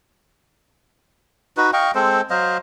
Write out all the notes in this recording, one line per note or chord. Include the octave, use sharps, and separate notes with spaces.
D#4 F#4 B4
D#5 F5 G5 C#6
G#3 C4 A4 C5
F#3 C5 D#5 F5